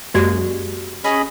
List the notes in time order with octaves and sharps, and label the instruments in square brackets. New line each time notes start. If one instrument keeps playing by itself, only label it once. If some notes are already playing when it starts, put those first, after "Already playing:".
[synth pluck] F#2 G#3 A#3 [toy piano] F#4 G4 D5
[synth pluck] C#4 [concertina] G#4 D#5 B5